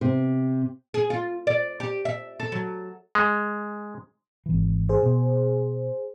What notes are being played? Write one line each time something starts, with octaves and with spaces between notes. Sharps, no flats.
C3
G#4
F4
D5
G4
E5
A4
F#3
G#3
G#1 E3
G#4 C5
B2